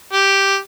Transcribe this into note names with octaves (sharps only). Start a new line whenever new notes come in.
G4